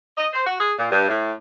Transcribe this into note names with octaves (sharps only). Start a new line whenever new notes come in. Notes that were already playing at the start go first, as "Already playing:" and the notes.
D#5
C5
F#4
G#4
A#2
G2
A2